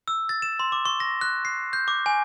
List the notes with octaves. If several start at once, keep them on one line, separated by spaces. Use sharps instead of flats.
E6
A6
E7
C6
D6
C#6
A#6
F#6
C7
G6
D6
G#5